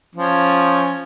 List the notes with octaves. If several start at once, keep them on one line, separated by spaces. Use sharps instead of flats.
F3 C#4